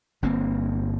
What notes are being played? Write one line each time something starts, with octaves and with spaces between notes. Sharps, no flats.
G1 G2 A#3 C4